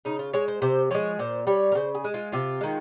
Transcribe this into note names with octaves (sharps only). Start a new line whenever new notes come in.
C#3 D#4
F4
G#3 C#5
C5
C3 C5
F3 G#3 C#5
A#2 C5
G3 C#5
A#4
C#3 C5
G#4
G#3
F4
C3 F4
D#3 G#3